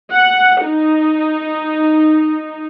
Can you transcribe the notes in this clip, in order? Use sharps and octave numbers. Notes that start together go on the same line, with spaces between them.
F#5
D#4